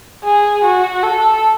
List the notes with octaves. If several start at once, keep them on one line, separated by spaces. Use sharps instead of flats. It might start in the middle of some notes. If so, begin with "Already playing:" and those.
G#4
F#4
A4